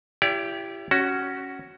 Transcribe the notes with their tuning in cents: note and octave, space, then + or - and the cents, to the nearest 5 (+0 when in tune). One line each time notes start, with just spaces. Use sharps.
E4 +30 G4 +0 D5 -35
C#4 +0 F#4 +10